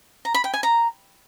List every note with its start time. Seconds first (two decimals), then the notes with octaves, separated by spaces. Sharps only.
0.25 A#5
0.34 B5
0.44 G5
0.54 G#5
0.63 A#5